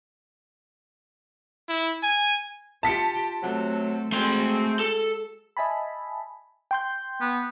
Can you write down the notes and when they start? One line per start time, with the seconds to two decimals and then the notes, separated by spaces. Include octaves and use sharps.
1.68 E4
2.03 G#5
2.83 F4 G4 A5 B6 C#7
3.42 C3 F#3 A3 C4 A4
4.12 G#3 A3 C4 F#4 G#4 C6
4.79 A4
5.57 D#5 E5 G#5 A5 B5
6.71 G5 C6 G6
7.21 B3